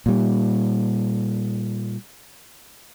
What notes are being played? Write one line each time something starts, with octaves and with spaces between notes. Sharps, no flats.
A#2 G3